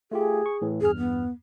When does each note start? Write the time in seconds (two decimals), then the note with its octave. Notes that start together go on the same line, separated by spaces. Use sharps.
0.11 A3 F4 G4 G#4
0.46 C#6
0.62 A2 E3
0.81 E2 G2 G#4 F6
0.97 B3